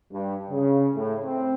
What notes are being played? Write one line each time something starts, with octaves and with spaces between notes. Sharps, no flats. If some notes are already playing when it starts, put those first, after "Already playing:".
G2
C#3
A2
C4